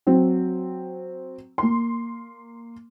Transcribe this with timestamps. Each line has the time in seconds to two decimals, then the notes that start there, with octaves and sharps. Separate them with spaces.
0.07 F#3 C4
1.58 A#3 C6